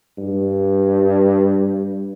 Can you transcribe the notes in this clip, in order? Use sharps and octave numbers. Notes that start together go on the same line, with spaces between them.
G2